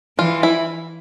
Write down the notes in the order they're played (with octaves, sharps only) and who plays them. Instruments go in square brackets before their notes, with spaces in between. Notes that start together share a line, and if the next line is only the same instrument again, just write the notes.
[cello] E3 [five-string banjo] F4
[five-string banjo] E4